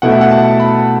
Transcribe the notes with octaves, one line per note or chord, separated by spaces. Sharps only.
B2 A3 E4 F#5
E5
F#5
A5
B5